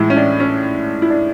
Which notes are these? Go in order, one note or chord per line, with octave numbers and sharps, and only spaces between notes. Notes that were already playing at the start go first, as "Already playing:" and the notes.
Already playing: A2 E3 G#3 E4
C#4
D4
C#4
E4
D4